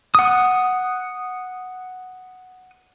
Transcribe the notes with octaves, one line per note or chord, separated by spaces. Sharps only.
F#5 D#6